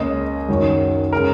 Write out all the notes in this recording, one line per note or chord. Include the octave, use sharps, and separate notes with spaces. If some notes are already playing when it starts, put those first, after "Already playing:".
Already playing: C#2 C#3 A#3 D#5
F#2 D#3 F#3
C#3 G#3 A#4